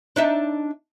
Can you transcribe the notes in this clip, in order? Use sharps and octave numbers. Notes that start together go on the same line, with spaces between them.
D4 D#4 E5